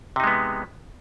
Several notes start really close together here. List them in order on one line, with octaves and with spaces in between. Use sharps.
C3 D#4 G#3 B3